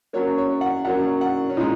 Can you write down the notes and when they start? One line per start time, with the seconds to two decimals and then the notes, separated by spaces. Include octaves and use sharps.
0.13 F#2 F#3 A#3 C#5
0.38 C#5
0.61 F#5
0.85 F#2 F#3 A#3 F#5
1.21 F#5
1.50 C#4
1.57 A#2 G#3 D#4